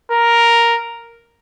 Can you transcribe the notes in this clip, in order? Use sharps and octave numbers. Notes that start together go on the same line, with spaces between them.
A#4